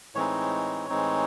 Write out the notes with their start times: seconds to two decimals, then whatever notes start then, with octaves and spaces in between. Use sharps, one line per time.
0.15 A2 E3 G#3 C4 D#4 C#5
0.89 A2 E3 G#3 C4 D#4